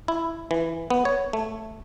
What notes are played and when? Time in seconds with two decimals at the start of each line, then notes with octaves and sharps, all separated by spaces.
0.08 E4
0.51 E3
0.90 B3
1.05 C#5
1.33 A3